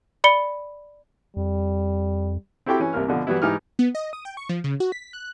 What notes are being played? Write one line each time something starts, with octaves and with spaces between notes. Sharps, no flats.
D5 B5 C#7 G7
F2 G3
C4 E4 F#4 G4 A4 G5
E3 C#4
C2 C3 A#3 F6
B2 D3 F3
E3 F#3 G3 B3 E4
G#2 E3 D#4 G4 F6
B3
D#5
D#6
G5
C#6
F3
C#3
F#4
B6
F#6